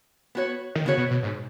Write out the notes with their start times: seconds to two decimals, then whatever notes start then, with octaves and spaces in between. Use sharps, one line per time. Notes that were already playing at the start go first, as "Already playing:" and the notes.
0.35 B3 F#4 C#5
0.75 D#3
0.85 C#3 B3 F#4 C#5
0.97 B2
1.11 B2
1.23 G#2